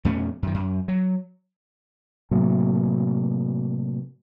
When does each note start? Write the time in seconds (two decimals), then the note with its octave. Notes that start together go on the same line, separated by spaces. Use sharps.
0.05 F2 B2 A3 C#4
0.43 F#2 D#3
0.54 F#2
0.88 F#3
2.31 A2 C3 F#3 A#3